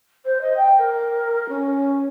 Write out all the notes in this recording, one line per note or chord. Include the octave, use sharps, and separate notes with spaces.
C5
D#5
G5
A#4
C#4